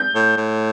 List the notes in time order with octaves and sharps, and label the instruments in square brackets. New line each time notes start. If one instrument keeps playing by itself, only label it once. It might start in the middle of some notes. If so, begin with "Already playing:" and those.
Already playing: [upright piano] G6
[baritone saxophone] A2
A2